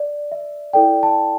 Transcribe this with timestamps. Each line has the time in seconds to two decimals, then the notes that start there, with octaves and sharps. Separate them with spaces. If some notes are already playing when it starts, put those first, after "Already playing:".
Already playing: D5
0.32 E5
0.73 E4 A4 D5 G5
1.03 A5